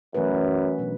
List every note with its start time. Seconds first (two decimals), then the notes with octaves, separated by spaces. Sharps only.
0.15 F#2 E3 A3 C#4 F#4 B4
0.78 B2 F#3 B3 D4